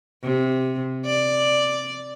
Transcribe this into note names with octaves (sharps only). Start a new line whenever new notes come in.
C3
D5